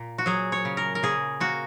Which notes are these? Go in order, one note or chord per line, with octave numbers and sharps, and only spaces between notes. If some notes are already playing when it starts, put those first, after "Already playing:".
Already playing: A#2
F#4
F#3 G#4
C#5
C#3
A#4
A#4
C#3 G#4
A#3 F#4